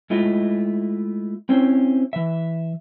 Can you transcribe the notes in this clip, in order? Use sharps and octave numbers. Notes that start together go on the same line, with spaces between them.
G#3 A3 E4 F4 D#5
C4 C#4 E4 C5
E3 E5